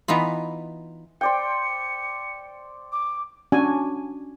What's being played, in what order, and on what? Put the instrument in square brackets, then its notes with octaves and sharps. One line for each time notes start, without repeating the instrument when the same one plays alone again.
[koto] E3 B3 D#4 F4
[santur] C5 D5 G5 [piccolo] C#7
[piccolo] D6
[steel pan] C#4 D4 F#4 G#5